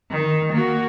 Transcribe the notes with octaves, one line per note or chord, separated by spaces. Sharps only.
D#3
A#3 F#4